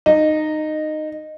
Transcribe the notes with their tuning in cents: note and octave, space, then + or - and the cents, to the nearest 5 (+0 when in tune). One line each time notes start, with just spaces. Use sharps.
D#4 -15